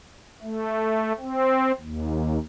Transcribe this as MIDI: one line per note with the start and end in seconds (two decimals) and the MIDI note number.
0.41 1.12 57
1.20 1.72 60
1.80 2.38 39